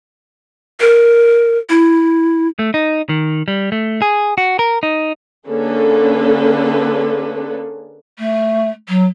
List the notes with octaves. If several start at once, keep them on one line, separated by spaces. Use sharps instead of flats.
A#4
E4
A3
D#4
D#3
G3
A3
G#4
F#4
A#4
D#4
D3 A#3 C#4 G#4 A4 B4
A3
F#3